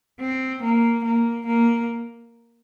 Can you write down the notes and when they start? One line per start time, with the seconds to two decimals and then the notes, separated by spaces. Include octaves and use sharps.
0.20 C4
0.63 A#3
1.04 A#3
1.46 A#3